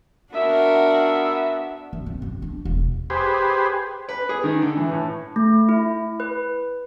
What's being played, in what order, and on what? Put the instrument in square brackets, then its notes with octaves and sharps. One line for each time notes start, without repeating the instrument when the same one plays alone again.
[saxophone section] B3 E5 [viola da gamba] D4 F#4 A#4
[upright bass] F#2
C4
F#2
D4
E1
[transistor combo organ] G4 G#4 B4 C5
[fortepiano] B4
G#4
D#3
D3
E3
A2
[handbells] A3
E4
B4